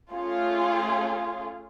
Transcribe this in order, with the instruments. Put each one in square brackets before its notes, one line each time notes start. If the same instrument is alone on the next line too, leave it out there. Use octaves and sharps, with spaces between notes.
[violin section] A3 C#4 F4 G#4